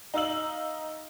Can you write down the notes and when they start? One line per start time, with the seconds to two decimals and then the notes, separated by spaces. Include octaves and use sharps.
0.14 D#4 F5 E6 F#7